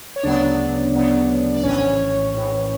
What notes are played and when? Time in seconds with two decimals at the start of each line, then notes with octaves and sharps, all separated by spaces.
0.16 C#5
0.23 D2 C#3 F#3 B3 D4 D5
0.94 D2 C#3 F#3 B3
1.52 D5
1.63 A#1 A2 E3 C#4 C#5
2.33 A#1 A2 E3